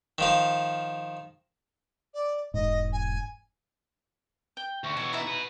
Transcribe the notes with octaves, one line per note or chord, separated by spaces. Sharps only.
D#3 F3 F5
D5
E1 G#2 D#5
G#5
G5 G7
D2 C#6
B2 E3 C#5
D#4 E4 E5
F#4 B4 D#7